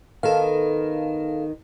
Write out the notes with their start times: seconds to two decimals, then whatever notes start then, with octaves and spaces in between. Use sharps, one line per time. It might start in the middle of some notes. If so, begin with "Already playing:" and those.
0.23 D#3 B3 A4 F5